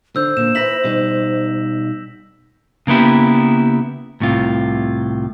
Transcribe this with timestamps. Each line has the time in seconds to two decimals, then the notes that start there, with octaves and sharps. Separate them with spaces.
0.16 D3 C5 E6 G6
0.37 A#2 A#3 E7
0.55 E4 A#4 B4 A#6 B6 F#7
0.84 B2 G3 D#4
2.87 C#3 A#3 B3 E4 G4
4.20 C2 A2 C3 F4